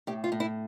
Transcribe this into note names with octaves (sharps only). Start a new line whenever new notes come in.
A2 G4
F4
A2
E4